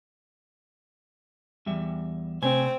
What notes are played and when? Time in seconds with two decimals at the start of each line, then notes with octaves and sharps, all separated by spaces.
1.66 E2 G3 E5
2.42 C3 A3 C4 G#5